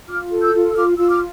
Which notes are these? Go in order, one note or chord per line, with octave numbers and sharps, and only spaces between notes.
F4 D6 F6
A4
E6 G6
F4
E6
F4 D6 F6
F4 E6
D6 F6